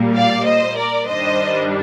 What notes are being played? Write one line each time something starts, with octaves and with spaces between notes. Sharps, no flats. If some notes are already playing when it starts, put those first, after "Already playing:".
Already playing: A#2 G3 A#3
D5 F5
C5 D#5
A#4 D5
G2 D#3 G3 D4 C5 D#5